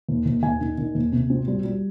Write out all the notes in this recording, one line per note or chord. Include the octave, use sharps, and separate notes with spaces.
D#2
D#2
D#2 G#5
D#3
D#3
D#2
C3
C4
G3
G3